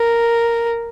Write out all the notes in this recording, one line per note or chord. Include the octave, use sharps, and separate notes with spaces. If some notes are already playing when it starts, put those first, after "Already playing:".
Already playing: A#4